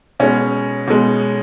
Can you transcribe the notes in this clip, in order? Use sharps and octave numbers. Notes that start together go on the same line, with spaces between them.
B2 G#3 C#4
B2 G#3